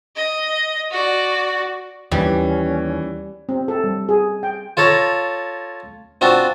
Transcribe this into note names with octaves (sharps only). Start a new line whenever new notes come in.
D#5
F#4 D5
D#2 E3 G3 C#4
C4
A4
G3
G#4
G5
F4 A4 C#5 A#5
C4 D4 F4 F#4